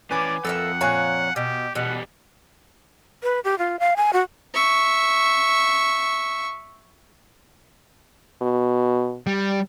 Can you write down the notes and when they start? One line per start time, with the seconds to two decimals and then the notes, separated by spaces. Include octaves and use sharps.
0.11 E3 C#4 B4 D5 G#5 D6
0.45 F2 A4 A#4 E5 F#5
0.81 A#2 C#5 F5 G#5 A#5 F#6
1.36 B2 G4
1.75 E2 B2 G3 F#5
3.23 B4
3.44 G4
3.59 F4
3.80 F5
3.96 G#5
4.13 F#4
4.54 E5 C#6
8.42 B2
9.27 G3